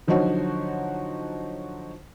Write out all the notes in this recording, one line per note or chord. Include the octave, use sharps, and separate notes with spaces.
D3 F3 F#3 D#4 F#4 C#5